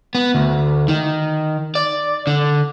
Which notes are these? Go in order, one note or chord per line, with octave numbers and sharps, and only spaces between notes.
B3
D2
D#3
D5
D3